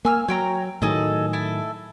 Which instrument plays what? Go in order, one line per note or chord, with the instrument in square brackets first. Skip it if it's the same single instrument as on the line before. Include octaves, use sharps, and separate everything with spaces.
[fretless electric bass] A#3 [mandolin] G#5 E6 F6
[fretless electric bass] F#3 [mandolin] C#5 G5 A#5
[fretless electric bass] A2 D#3 F#3 [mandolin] G#4 A4 D#5
[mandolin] E4 A4